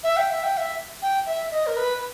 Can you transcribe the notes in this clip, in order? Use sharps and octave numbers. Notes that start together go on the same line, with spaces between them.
E5
G5
E5
G5
E5
G5
E5
D#5
A#4
B4